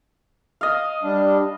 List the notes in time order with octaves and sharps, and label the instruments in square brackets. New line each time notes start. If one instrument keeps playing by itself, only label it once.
[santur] D#5 F5
[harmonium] G3 D4